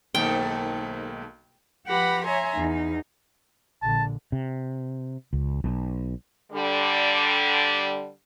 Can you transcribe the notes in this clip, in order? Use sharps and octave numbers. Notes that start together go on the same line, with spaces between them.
B1 G#2 D#3 A3 A#3 G5
F3 G4 B4 F#5 B5 A#6
C#5 E5 G#5 A#5 C6
E2 D#4
A#1 D3 A5
C3
C#2
B1
D3 G3